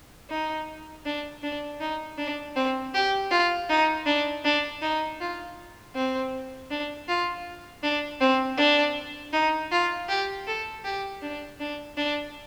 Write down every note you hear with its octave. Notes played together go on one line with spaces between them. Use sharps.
D#4
D4
D4
D#4
D4
C4
G4
F4
D#4
D4
D4
D#4
F4
C4
D4
F4
D4
C4
D4
D#4
F4
G4
A4
G4
D4
D4
D4